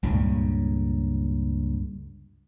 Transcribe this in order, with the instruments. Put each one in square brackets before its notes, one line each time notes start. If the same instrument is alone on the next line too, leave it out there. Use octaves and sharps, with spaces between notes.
[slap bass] C#2 G2 A#2 C#3